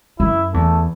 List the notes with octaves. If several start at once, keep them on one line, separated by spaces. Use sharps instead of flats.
F#2 E4
E2 A3